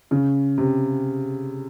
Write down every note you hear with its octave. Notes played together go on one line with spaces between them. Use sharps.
C#3
C3